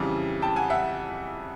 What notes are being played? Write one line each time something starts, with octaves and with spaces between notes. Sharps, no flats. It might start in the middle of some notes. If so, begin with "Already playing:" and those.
Already playing: F2 C#3 E3 G3
G5 A5
F#5 G#5
E5 F#5